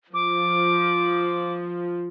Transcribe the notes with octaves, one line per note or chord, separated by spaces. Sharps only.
F3 D6